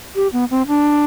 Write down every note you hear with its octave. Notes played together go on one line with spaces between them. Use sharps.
G4
B3
C4
D4